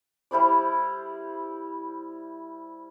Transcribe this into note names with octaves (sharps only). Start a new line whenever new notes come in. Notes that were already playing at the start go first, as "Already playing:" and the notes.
G3 E4 C5 D5